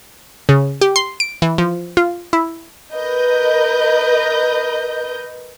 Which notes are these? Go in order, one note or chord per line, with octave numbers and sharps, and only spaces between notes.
C#3
G4
C6
D7
E3
F3
F4
E4
A#4 B4 D#5 G6